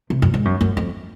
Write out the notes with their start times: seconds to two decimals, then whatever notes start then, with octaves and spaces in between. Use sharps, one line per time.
0.10 C3
0.22 F#2
0.34 G#2
0.45 F#2
0.61 F#2
0.77 F2